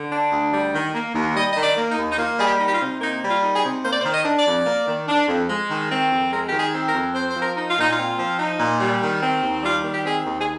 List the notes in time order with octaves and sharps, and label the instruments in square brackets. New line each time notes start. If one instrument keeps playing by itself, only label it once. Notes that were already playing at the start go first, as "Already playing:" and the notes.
Already playing: [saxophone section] D3
D4
D2
G3
D#3
A#3
D#2
G3 D#5
D#3 D#5
D5
A#3
D#4
D#2
D#4
A#3 F4
G3 G#4
G4
D#4
G4
F4
C3
A#3 D#4
G3
F4
D#4
G#4
C3
A#3 C5
D5
C5
D#3
D#5
D4
D5
F2
A#3
D#3
D4
F2
G#3
D#3
C4
F2
G#3 A#4
D#3 G4
G#4
C4
A#4
F2
C4 C5
F3 C5
A#4
D#4
F4
A#2 D#4
F4
C4
F3
D#4
A#2
G3
D#3
C4
D#2
G3 F4
D#3
G4
C4 G#4
D#2
G#4